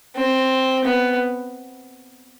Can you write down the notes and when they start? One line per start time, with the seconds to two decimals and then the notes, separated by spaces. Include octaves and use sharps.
0.15 C4
0.84 B3